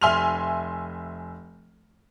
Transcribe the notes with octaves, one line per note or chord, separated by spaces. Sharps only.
F1 E5 G#5 C6 F6 F7